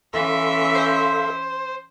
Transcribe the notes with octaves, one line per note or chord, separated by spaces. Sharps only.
E3 C#4 A4 E5 F5 C6
C5